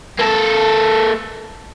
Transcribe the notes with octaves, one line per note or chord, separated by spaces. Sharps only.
A#3 A4